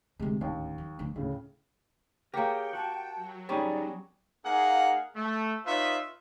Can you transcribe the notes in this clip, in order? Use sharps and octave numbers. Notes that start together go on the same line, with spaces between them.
D2 C3 G#3
D1 D#2 C#4
F#3
D2 G3
D2 A2 C#3
A#3 G4 G#4 A#4 C#5 G5
F#4 A5
F#3
G3 B3 C#4 D#4 G#4 D5
A#3 D#4 G#4 F5 F#5
A3
D#4 F4 B4 C#5 E5